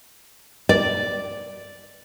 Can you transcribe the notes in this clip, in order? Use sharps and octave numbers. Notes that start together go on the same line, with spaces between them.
D5